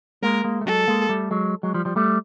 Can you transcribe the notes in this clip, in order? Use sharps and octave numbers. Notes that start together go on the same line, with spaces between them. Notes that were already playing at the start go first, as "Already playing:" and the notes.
G#3 A#3 A#4
G#3 A#3
A3
F#3 G#3 A4
G#3 A#3
G3 A3
F#3 G#3
F#3 G#3
F3 G3
F3 G3
G3 A3